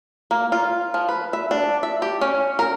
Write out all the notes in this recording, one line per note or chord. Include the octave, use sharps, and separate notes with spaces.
A#3
F4
F3
B4
E5
D4
E5
G4
C#4
A#4